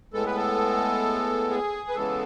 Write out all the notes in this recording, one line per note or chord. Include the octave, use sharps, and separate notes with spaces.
A2 G#3 B3 A4
B4
A4
G#4
B4
C#3 E3 G#3 B3 A4